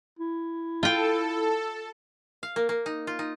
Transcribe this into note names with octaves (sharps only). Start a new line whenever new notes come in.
E4
F4 A4 G5
F5
A#3
A#3
D#4
F4
D#4